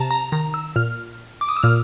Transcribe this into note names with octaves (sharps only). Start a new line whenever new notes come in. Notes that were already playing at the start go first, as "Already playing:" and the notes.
Already playing: C3 A5 A#5
A#5
D#3 A#5
E6
A#2 F6
D6
D#6
E6
A#2 F6